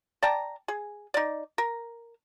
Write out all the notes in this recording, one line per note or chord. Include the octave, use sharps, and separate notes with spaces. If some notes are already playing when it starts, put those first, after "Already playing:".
D5 G5 A5 A#5
G#4
D#4 D5
A#4